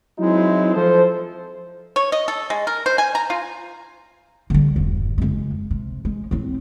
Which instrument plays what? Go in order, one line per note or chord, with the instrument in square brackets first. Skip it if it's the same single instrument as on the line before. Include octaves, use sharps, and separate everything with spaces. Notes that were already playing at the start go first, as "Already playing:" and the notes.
[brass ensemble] F#3 G#3 C4 D#4 E4
F3 A4 C5
[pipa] C#5
D#5
A4
G#3
A#4
C5
G#5
A#5
F4
[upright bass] D3 G3
E1 G2
F#1 G#3
C3
G#3
A2 C4